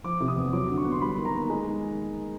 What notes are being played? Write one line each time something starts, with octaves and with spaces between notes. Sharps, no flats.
F3 D6
C3
D#6
E2
F#3 D6
D3
C#6
B3
C6
G3 B5
D#3
A#5
A#3
G#3
D#3